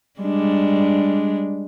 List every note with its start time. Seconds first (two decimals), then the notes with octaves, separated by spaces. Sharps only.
0.20 G3 G#3 D4